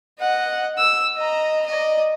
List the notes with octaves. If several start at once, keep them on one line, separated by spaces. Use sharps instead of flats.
D#5 F#5
E6
D#5 A#5
D5 D#5